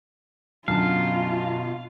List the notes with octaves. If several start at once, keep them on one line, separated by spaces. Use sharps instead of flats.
F#2 B2 D3 F4 F5 A5